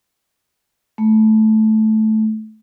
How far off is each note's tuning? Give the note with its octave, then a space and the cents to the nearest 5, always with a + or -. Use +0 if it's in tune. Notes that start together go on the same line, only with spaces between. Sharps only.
A3 -15